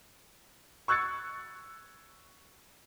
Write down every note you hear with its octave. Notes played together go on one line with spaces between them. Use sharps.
C#6 E6 F#6 G#6 A6 C#7